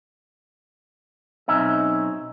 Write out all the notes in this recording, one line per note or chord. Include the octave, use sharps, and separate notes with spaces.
B1 C4 C#4 D#4 E5